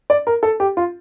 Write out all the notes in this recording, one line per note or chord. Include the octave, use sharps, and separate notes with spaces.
D5
A#4
A4
G4
F4